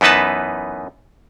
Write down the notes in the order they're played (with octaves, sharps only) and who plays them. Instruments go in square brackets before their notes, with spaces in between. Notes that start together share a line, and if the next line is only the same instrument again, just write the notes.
[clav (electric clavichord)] F#2 E3 B3 D#4 B4 A5